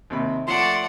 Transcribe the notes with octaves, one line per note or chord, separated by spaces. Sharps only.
D#2 C3 B5
F3 A3 D5 F#5 C6